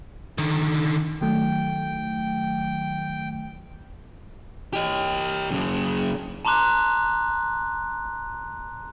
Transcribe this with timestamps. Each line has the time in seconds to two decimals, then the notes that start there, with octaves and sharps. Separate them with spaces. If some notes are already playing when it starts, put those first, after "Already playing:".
0.38 D3 D#3
1.21 D#3 F#3 A3 G5
4.73 G4 D#5
5.51 F#2 C#3
6.45 A5 A#5 C6 D6 F#6